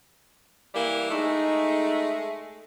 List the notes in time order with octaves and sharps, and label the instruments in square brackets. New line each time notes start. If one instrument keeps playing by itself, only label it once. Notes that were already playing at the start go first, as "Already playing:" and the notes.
[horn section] E3 G3 A#3
[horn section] G#3 A3 [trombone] D#4